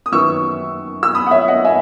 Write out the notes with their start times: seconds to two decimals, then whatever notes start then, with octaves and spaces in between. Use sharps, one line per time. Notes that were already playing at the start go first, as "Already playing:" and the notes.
0.06 D#6
0.12 F#2 D#3 F#3 B3 C#6 E6
1.03 E6
1.14 B5 D#6
1.26 F#5
1.31 C#5 E5
1.48 D#5 F#5
1.64 E5 G#5